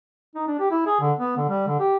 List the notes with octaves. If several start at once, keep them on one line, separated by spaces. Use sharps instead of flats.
D#4
D4
G4
E4
G#4
D3
B3
D3
G3
D3
G4